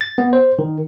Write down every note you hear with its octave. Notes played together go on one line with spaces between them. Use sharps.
A6
B3
C5
D#3